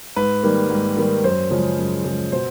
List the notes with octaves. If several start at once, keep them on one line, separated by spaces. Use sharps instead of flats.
G#2 B4
D#3 G3 A#3
G#2
D#3 G3 A#3
F#2 C5
C#3 F3 G#3
F#2
C#3 F3 G#3
B2 C5